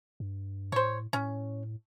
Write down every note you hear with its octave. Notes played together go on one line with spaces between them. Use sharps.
G2
A2 C5 C#5
A2 C#4